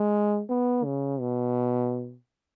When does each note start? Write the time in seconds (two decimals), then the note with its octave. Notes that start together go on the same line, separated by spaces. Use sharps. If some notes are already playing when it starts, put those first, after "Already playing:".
Already playing: G#3
0.49 B3
0.85 C#3
1.20 B2